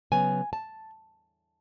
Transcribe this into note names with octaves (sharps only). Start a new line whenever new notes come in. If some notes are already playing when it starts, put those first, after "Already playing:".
C#3 F#3 B3 G#5
A5